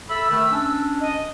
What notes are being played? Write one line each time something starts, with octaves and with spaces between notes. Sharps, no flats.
A4 E5 B5 E6
D#3 A3
C#4 D4
D#5